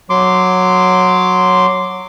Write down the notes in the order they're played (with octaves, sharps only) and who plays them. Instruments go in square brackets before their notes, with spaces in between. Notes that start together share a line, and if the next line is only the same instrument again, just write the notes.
[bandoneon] F#3 C6 D6